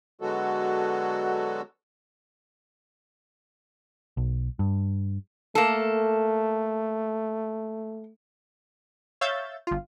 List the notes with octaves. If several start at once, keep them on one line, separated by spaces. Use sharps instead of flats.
D3 F#3 G#3 B3 F#4 A4
B1
G2
A3 A#3 A4
C#5 E5 F5 E6 G6 A6
G1 F4